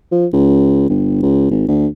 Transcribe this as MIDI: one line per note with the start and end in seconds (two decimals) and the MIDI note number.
0.12 0.26 53
0.33 0.88 37
0.90 1.20 31
1.22 1.47 37
1.51 1.65 32
1.68 1.87 38